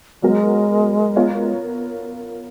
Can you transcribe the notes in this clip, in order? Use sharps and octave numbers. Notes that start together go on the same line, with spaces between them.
F#3 G#3 B3 F#4 A#4
B3 F4 A#4 C#5